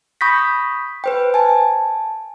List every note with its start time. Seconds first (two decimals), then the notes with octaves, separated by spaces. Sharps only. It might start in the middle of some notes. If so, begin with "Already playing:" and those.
0.21 B5 C#6 D#6 G6 A#6 B6
1.04 B4 C5 G5
1.34 G#5 A5